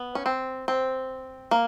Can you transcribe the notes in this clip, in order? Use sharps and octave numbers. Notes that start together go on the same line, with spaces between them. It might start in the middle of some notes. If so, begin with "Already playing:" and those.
Already playing: B3
C#4
C4
C4
A#3